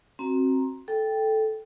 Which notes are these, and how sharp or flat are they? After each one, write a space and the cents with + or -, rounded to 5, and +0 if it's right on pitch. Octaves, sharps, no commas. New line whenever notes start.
C4 +25 F#4 +0 A#5 +0
A4 -10 G5 +0